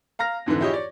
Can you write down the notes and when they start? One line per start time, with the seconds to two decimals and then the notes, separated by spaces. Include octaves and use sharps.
0.19 F5 A#5 F6 A#6
0.46 F2 G#2 D3 E3
0.61 E4 F4 G4 G#4 C#5 D#5
0.74 C#5 D5